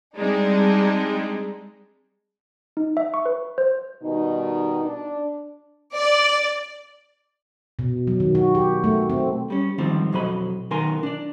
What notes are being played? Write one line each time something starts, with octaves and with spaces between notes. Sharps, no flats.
G3 G#3 C4 D4 D#4
D#4
E5
C#6
B4
C5
B2 D#3 G3 D#4
D4
D5
B2
F#3
D#3
F#4
G4
A3
C4
G3 C#4
G#2 D#3 F3 G3 C4
F2 B2 F#3 C5 D#5 B5
B1 D#3 B3 A#4 G#5 C6
D4 D5